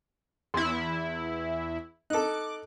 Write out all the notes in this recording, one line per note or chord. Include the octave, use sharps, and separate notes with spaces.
E2 E4 C6
D#4 A4 D6 F#6